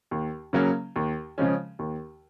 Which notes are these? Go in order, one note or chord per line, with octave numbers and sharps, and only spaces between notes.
D#2
C#3 F#3 A#3 C#4
D#2
C#3 F3 G#3 C#4
D#2